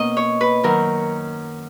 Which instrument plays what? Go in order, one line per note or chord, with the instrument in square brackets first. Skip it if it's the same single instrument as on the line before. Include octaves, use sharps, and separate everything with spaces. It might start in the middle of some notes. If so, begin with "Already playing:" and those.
Already playing: [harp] B2 A#3 C#4 D#5
C#5
B4
F#2 D#3 F#3 A#4